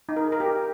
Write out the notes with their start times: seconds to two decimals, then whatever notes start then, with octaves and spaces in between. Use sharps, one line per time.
0.09 D#4
0.16 A#4
0.24 G#4
0.32 A#4
0.40 G4